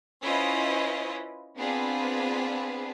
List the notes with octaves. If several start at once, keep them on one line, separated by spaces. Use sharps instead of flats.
C#4 E4 F4 B4 C5 D#5
B3 C4 D4 F4 G#4 B4